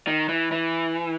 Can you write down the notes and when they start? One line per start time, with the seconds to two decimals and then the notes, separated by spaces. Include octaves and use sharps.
0.07 D#3
0.29 E3
0.52 E3